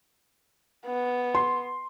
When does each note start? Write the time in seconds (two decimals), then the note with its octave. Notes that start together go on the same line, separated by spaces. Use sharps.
0.86 B3
1.35 C6